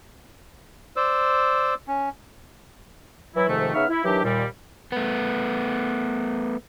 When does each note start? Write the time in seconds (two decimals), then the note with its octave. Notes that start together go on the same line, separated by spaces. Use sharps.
0.96 C5 D5 E6
1.88 C#4
3.35 E3 F#3 E4
3.48 F2 G#2 C3 D#3 F3 A3
3.74 C#3 B3 D#4 E5 C#6 F6
3.89 E4
4.05 D#3 E3 F#3 D4 G4
4.24 D#2 A#2 G3
4.92 A3 B3